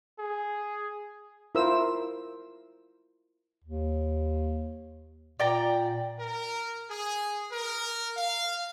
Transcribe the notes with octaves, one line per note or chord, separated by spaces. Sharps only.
G#4
E4 F4 A#4 C5 E6
D#2
A#2 D5 G5 A#5
A#4
G#4
A#4
F5